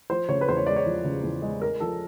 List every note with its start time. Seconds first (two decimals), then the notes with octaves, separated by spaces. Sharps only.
0.10 F3 C5
0.29 C#3 C#5
0.41 B4
0.49 E2 C5
0.57 C#5
0.67 G#3 D5
0.76 C#5
0.86 F3
1.04 C#3
1.23 E2
1.42 G#3
1.61 G#3 A#4
1.80 F3 A4